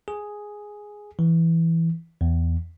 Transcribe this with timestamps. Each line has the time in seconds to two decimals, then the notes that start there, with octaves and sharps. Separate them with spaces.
0.08 G#4
1.19 E3
2.21 E2